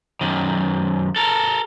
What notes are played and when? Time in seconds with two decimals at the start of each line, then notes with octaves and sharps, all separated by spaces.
0.21 F#2 D#3
1.16 A4 A#4